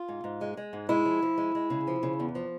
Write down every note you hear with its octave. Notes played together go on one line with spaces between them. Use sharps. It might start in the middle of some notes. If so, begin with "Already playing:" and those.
Already playing: F4
G#2
G#2
G#3
G#3
G#2
G#3 E4
F3
F3
G#3
G#3
C#3
F3
C#3
E2
F3